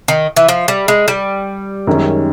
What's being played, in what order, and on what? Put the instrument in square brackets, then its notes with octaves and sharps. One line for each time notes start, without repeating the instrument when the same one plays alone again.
[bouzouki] D#3
E3
F3
G3
G#3
G3
[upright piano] F#2 D#3 G#3 C#4